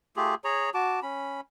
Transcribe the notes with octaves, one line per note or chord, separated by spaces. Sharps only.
A3 F4 G4 G#4
G#4 C#5 A#5
F#4 A5 D6
C#4 B5